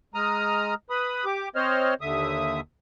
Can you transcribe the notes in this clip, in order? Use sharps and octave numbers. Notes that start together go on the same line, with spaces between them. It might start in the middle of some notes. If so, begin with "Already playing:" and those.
G#3 A#5 D#6 F6
B4 B5 D#6
G4 D6
C4 C5 C#5 D#5 F6
D#2 D3 E5 D#6